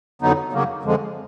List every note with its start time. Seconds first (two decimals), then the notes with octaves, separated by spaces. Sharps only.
0.22 F2 D3 F#3 B3 D#4
0.52 F#2 C#3 F#3 A#3
0.83 F2 D3 F3 G#3